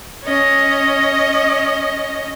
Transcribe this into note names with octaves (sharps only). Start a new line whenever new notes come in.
C#4 D#5